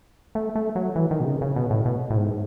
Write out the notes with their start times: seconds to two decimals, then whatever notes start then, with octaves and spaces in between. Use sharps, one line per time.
0.35 A3
0.55 A3
0.75 F#3
0.96 E3
1.11 D#3
1.20 B2
1.25 C#3
1.41 C#3
1.56 B2
1.71 A2
1.86 B2
2.10 A2
2.17 G#2